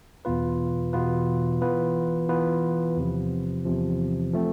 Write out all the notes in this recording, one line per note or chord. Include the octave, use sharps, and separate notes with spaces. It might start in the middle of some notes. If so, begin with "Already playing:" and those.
E2 B2 B3 F4 B4
E2 B2 B3 F4 B4
E3 B3 F4 B4
E3 B3 F4 B4
E2 C3 F3
E2 C3 F3
F3 A3 C4